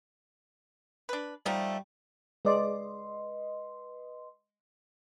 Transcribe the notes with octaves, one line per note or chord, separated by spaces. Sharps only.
D4 B4
F3 G3 A3 D#4
G#3 B4 D5 D#5 C6